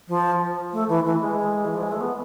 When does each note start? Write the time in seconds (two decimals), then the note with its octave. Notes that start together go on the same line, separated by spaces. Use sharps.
0.08 F3
0.73 A3
0.89 E3
1.05 E3
1.21 G#3
1.65 E3
1.74 F3
1.83 G#3
1.92 A3
2.01 B3